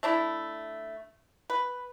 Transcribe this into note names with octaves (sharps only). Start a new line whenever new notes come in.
A3 D4 E4
B4